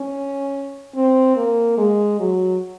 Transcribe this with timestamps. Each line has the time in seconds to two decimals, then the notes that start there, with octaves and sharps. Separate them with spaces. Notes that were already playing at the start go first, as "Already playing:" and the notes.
Already playing: C#4
0.95 C4
1.36 A#3
1.78 G#3
2.20 F#3